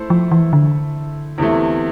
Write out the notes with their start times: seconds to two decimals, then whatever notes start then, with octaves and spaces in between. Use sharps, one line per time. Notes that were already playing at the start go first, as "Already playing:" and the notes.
Already playing: A3 E4 A4 C5
0.10 F3
0.31 E3
0.53 D3
1.38 E2 C3 E3 A3